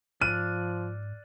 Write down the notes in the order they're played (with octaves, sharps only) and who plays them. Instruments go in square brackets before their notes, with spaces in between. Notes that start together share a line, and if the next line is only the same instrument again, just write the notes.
[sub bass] G#2 [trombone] F3 [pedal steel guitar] D5 F6 F#6 [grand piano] D#7